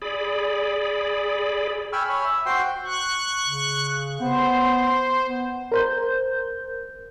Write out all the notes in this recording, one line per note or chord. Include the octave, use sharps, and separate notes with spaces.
G#4 D5 B5
G5 G#5 B5 C#6 E6 F6
C#5 G#5 B5 C#6
E5
F#4 C5 G5 C6
C#6 F#6
C#3
B3 C5
B3
A#4 C5 G6